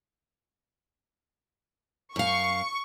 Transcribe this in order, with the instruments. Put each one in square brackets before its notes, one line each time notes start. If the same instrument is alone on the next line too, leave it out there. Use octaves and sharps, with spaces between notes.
[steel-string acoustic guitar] F#2 F5 [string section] C#6